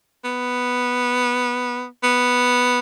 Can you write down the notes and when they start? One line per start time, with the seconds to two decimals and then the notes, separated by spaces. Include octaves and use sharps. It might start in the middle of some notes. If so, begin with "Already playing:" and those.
0.24 B3
2.03 B3